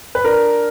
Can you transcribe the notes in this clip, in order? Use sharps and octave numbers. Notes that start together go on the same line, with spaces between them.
B4
D4 A#4